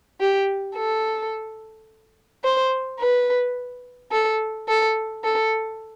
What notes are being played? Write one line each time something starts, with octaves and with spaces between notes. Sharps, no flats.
G4
A4
C5
B4
A4
A4
A4